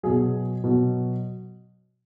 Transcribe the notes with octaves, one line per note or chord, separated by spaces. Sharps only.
B2 F#3 G#4
B2 F#3